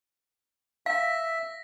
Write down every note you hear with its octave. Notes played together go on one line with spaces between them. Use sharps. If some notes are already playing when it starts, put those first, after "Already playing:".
E5 F5 A#6 B6